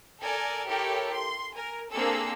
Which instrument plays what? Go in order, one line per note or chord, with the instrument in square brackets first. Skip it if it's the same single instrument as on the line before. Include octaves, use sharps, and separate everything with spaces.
[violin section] A4 A#4 D5 G#5
E4 G4 A4 A#4 C#5
C6
A#4 G#5
A#3 C4 D4 G#4 A4 E6